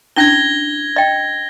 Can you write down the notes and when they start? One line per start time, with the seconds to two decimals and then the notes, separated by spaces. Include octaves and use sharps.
0.16 C#4 D4 E4 G#6 A#6 G7
0.96 D#5 G5